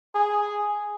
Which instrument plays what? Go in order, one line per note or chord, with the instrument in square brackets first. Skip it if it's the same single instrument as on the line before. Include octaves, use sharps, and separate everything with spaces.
[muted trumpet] G#4